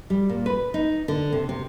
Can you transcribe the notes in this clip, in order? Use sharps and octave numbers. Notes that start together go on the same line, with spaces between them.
G3
A#2
B4
D#4
D3
C3
C3